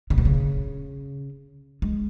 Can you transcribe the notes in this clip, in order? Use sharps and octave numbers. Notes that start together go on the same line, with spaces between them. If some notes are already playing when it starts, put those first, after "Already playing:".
C#3
B2
C#3
G#3